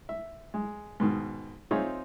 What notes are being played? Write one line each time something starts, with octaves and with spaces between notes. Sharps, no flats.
E5
G#3
G#2 B2 D#3
C4 D#4 F4 G#4 C#5 E5